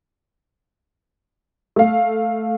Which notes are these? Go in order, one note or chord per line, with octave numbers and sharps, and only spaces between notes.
A3 F5